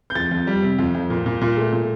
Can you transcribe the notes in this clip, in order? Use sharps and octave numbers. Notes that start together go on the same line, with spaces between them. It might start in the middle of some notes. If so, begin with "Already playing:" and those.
G6
F2 A6
F2
G3
C3
F2
F2
A#2
A#2
A#2
A3
A#2